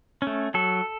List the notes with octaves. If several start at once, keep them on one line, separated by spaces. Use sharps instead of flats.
A3 C#4
F#3 A4